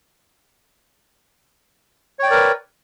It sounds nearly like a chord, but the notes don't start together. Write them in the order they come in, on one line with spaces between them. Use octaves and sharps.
C#5 G5 D5 A#4 B4